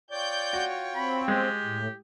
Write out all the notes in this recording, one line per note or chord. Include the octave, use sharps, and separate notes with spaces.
F4 C#5 D5 G5 G6
F#4
C4 B5
G#3 G4
A2